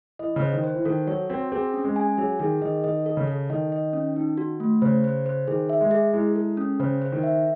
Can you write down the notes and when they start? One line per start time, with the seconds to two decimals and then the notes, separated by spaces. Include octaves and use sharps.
0.19 E3 D#5
0.36 C#3
0.42 C5
0.53 D#3
0.64 C5
0.74 E3
0.85 D#3 A4
1.07 F#3 C#5
1.30 C4 F#4
1.52 C4 G#4
1.74 C#4
1.85 G#3
1.96 G#5
2.18 F#3 G#4
2.39 D#3 G#4
2.61 D#3 D#5
2.84 D#3 D#5
3.06 A4
3.17 C#3
3.27 A4
3.50 D#3 D#5
3.72 D#5
3.93 C#4
4.16 D#4
4.37 F#4
4.60 A3
4.82 C#3 C5
5.04 C5
5.26 C5
5.48 D#3 G#4
5.69 E5
5.81 G#3
5.91 G#4
6.13 G#3 E4
6.36 A4
6.57 C#4
6.80 C#3 C5
7.02 C5
7.12 D#3
7.23 E5